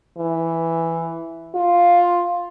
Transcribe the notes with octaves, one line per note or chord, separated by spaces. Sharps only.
E3
F4